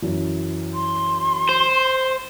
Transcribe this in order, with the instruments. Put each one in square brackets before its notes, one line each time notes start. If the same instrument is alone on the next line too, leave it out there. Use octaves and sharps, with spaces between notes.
[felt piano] F#2 E3
[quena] C6
[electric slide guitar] C5